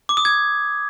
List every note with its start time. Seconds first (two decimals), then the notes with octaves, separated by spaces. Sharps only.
0.09 D6
0.17 D#6
0.25 G#6